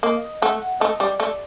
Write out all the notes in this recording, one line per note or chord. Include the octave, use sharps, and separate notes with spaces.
A#3 D#5
A3 F#5
A3 D#5
G3 D5
A3 D5